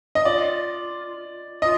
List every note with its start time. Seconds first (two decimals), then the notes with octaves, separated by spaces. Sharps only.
0.15 D#5
0.25 F4 D5
1.62 F4 D#5